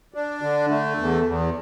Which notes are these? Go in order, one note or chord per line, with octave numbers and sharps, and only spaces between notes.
D4
D3
A3
E2
E2